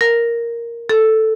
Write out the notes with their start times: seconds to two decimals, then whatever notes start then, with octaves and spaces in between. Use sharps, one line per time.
0.01 A#4
0.89 A4